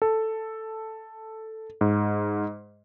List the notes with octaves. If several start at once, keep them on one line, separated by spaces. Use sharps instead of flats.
A4
G#2